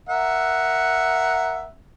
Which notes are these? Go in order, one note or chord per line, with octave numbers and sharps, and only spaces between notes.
A#4 E5 F#5